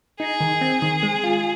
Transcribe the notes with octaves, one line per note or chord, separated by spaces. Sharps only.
D#4 G#4
D#3
C4
D#3
G#3
F4